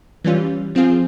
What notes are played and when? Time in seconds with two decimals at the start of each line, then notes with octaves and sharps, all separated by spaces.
0.25 E3 G3 C#4 F4
0.75 F3 C4 F4 G#4